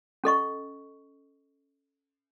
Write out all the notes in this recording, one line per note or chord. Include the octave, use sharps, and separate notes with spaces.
C#4 A4 D#5 C#6